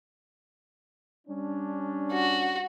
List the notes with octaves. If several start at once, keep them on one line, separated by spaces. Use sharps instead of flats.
G3 C#4 D4
F#4